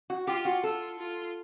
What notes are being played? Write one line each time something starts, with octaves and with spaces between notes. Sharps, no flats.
F#4
F4 G4
F#4
F4 A4
F4